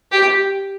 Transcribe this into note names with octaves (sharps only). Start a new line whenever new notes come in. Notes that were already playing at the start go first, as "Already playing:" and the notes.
G4